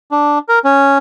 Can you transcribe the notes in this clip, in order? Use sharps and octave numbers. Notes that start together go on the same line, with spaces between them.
D4
A#4
C#4